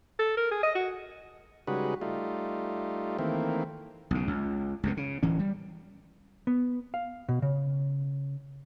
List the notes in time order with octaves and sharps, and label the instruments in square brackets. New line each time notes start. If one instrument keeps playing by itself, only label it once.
[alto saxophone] A4
A#4
G#4
D#5
F#4
[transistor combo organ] C#3 G3 G#3 D#4 F#4 B4
G3 A3 D#4 F4
D#3 E3 A3 A#3 C4
[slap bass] B1 C#3
C#2
C#2 F#2 B2
C#3
D1 E3 C#4
G3
[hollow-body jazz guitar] B3
F5
B2
C#3